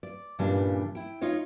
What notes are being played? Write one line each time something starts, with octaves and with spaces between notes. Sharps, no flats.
D5
G2 A#2 C#3 E3 G3 D4
E4 G5
D#4 F4 C#5